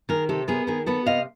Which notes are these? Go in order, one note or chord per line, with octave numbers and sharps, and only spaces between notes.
D#3 G#4 A#4
C3 G4 A4
B3 G#4 A#4
D#3 G#4 A#4
B3 A4 B4
C3 D#5 F5